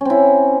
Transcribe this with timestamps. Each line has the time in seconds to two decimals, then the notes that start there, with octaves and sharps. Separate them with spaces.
0.01 C#4
0.05 C4
0.10 E4